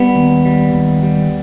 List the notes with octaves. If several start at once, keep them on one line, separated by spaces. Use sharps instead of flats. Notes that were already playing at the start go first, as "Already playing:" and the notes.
Already playing: G3 B3
D#2
G3
D#2
G3